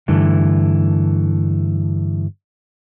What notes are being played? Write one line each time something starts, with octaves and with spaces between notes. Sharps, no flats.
G2 D3 E3 A3